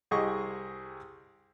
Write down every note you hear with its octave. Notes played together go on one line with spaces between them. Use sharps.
C2 G4 G#4 D#5 C#6